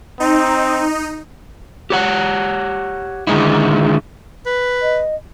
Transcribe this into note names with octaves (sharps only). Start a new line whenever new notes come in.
C4 D#4
G4 C#5 F#5
D3 D#3 G#3 D#4 E4
B4
D#5